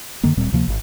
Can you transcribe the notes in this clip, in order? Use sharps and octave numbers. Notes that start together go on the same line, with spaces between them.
F#2 D3 D#3 A#3
D1 A#2 G3 C4
D2 C3 F3 A#3
G#1